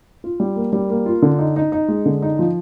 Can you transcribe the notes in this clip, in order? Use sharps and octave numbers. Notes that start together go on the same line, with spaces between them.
F4
G3
A#3
G3
A#3
F4
D3
D#4
D#4
D#4
G#3
D3
D#4
F3